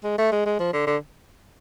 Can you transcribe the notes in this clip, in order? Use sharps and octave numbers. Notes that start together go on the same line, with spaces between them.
G#3
A3
G#3
G#3
F3
D3
D3